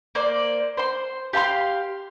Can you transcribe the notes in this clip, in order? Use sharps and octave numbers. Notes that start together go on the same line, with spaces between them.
A#3 C5 D5
C5 C6
G4 F5 A5 C6